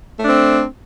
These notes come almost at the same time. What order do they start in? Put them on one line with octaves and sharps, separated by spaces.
A3 D4 C4